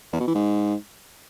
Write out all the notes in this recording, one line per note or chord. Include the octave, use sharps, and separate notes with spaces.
E2
B2
E3
G#2